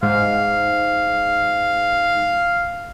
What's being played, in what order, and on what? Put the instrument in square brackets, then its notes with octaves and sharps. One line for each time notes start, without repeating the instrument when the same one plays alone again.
[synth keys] G#2 [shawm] F5